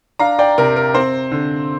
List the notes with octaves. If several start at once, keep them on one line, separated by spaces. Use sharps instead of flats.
D4 F5 A#5
D5 G5
C3 A#4
A#4
C4 C5
D3